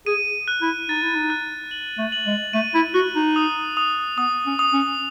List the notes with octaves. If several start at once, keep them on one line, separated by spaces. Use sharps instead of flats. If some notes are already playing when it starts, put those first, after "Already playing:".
G#4 D#7
F#6
E4
D#4 A6
E4
D#4
F#6
F#7
A3
F#7
G#3
A3 D#7
E4
F#4 F#6
D#4
D#6
D#6
B3 D#6
C#4
D#6
C#4